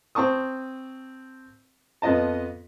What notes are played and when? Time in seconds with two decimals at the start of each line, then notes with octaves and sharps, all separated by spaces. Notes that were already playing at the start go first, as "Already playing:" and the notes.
0.15 C4 A5 C#6 D#6
2.02 F2 B3 F4 D#5 A5